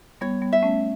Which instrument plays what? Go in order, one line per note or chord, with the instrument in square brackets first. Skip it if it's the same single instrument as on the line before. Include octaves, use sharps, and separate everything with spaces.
[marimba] G3 B3 [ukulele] C#5
[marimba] G3 B3
[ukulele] E5
[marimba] A3 C#4